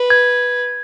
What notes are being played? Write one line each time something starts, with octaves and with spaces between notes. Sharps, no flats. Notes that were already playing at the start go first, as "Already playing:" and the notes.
Already playing: B4
G#6